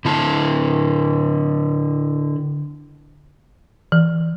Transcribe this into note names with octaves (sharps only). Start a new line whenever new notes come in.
D3 E4 A5
E3